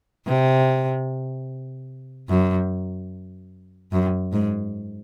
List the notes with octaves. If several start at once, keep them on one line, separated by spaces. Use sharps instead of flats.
C3
F#2
F#2
G#2